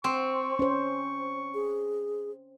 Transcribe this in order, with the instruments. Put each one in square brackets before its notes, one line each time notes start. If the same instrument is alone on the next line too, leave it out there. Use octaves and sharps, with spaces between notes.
[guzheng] C4 [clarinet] C#6
[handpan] C#4 C5
[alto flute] G#4